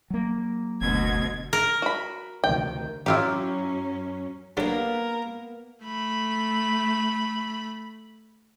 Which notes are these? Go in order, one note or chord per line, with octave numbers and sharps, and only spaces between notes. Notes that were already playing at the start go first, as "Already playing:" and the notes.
F#3 A#3
F#1 D2 B2 G#6
A#4
F#4 B5
D2 C3 D#3 G5
F#2 F#3 C#4 E4 F4 G4
D3 F#3 G3 A#3 B3 A#4
A3 B5